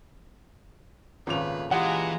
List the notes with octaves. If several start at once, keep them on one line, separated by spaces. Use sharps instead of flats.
G#1 A#2 C#3 A3 B4 F7
E3 G#3 F4 G4 G#4 D#5 F#5 A#5